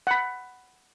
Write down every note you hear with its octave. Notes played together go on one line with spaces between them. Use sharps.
F#5 B5